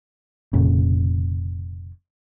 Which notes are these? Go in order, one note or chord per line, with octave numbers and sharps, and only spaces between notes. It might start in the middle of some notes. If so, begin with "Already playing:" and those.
F1 F2 A#2 C#3